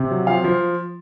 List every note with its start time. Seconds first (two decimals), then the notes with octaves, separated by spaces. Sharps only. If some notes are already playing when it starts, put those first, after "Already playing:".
Already playing: C3
0.11 F#3
0.27 F3 F5
0.44 F3